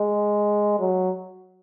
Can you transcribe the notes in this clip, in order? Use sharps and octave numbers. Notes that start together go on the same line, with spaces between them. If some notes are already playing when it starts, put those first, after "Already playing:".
Already playing: G#3
F#3